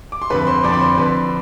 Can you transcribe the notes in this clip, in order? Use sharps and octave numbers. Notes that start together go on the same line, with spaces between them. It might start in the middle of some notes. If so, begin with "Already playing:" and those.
D6
C6
F2 D3 B4 B5
C5 C6
F2 D3 D5 D6
B5
C5 C6
F2 D3 B4 B5